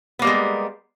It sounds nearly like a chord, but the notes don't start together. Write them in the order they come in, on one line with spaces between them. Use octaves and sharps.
B3 A#3 G3 G#3